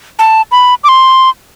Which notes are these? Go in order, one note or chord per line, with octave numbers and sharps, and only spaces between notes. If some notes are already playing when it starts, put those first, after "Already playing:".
A5
B5
D6
C6